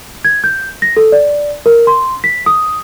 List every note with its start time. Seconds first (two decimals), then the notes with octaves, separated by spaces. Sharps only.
0.25 G#6
0.44 G6
0.82 A#6
0.97 A4
1.12 D5
1.66 A#4
1.87 C6
2.24 B6
2.46 D#6